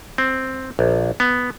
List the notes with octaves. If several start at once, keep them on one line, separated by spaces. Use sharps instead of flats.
C4
A#1
B3